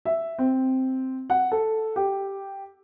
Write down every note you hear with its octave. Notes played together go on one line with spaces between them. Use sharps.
E5
C4
F#5
A4
G4